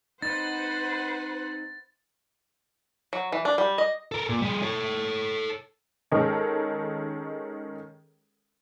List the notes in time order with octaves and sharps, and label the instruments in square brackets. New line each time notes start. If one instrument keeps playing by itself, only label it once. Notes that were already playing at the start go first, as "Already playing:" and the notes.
[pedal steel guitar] C4 D#4 [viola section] B4 C5 F#5 [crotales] A6
[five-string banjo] F#3
E3
D4
G3
D#5
[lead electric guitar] A4 A#4
A#2
G3 G#4
A4 C#5
[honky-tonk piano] D#3 G#3 C#4 A4 A#4 C#5